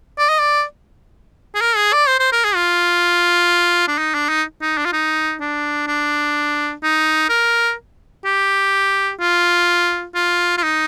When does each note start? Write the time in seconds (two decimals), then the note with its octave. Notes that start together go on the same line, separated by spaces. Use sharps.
0.18 D5
0.29 D#5
0.39 D5
1.55 G#4
1.61 A#4
1.76 G#4
1.93 D5
2.08 C5
2.19 C5
2.32 A#4
2.44 G#4
2.55 F4
3.88 D4
3.98 D#4
4.14 D4
4.29 D#4
4.61 D#4
4.77 D4
4.85 F4
4.93 D#4
5.40 D4
5.87 D4
6.83 D#4
7.29 A#4
8.25 G4
9.20 F4
10.15 F4
10.58 F4
10.63 D#4